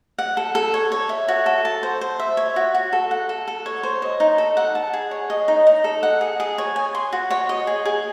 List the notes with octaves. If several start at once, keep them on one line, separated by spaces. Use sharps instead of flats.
F#5
A4
A4
C#5
C#5
E5
F#4
A4
A5
C5
C5
E5
C#5
F#4
F#4
A4
F#5
A4
A4
C#5
C5
D#5
D#4
A4
F#5
A5
G#4
C#5
D#5
D#4
D#4
A4
F#5
G#4
G#4
C#5
G#5
C6
F#4
C#5
D#5
G#4
G#4